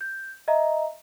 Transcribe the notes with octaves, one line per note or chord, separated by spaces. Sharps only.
G6
D#5 E5 A#5